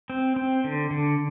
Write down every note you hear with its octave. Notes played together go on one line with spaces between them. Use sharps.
C4
C4
D3
D3